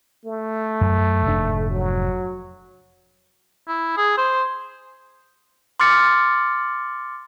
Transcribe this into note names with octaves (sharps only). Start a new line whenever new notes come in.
A3
F#2
F1 G#2 D4
F#3
E4
G#4
C5
C6 D6 F6 A6 C#7